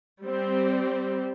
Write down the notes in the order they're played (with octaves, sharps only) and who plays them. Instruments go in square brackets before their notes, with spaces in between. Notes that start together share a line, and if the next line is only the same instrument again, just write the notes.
[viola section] G3 C4